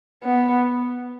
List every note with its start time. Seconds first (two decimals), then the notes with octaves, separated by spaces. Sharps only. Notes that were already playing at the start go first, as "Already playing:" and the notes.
0.23 B3